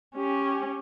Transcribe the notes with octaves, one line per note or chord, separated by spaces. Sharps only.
C#4 G4